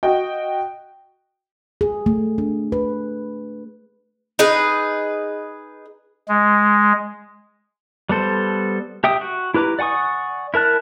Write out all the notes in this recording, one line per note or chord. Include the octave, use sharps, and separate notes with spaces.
F#4 D#5 G5
G#4
A3
D4
B4
D#4 G#4 B4
G#3
G3 B3 A4 C5
G4 E5 G5 D#6
F#4
E4 G4 B4 A#5 D6
D5 F#5 G#5 C#6 D#6
E4 A#4 A5 F#6